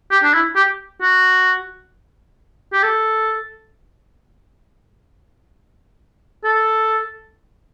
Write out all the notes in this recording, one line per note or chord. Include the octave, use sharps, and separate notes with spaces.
G4
D4
E4
G4
F#4
G4
A4
A4